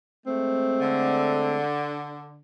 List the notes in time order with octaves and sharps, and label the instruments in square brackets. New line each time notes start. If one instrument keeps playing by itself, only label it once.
[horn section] G#3 A3 C4
[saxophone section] D3